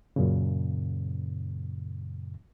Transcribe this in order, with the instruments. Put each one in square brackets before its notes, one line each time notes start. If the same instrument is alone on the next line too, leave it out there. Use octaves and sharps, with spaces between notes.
[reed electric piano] F#2 A#2 C#3